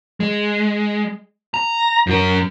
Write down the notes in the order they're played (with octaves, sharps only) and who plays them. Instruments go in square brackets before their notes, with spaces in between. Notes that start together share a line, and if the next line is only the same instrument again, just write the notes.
[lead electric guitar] G#3
A#5
F#2 A#4